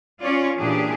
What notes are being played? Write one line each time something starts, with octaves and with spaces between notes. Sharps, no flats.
C#4 F4 C#5 D5
A#2 E3 D4 G4 G#4